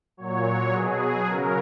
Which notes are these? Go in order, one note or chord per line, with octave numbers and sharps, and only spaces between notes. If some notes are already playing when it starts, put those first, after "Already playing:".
A#2 F#3 C#5
B2 F#3 G#4
C#3 F#3 A#4